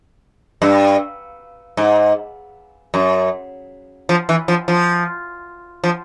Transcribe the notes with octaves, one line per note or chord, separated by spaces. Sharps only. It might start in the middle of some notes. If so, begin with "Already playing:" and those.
G2
G#2
F#2
F3
E3
F3
F3
F3